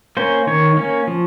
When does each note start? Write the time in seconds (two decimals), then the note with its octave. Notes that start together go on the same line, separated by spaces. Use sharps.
0.17 A#3 C#4 C5
0.47 D#3 C#5
0.77 A#3 C#4
1.07 F3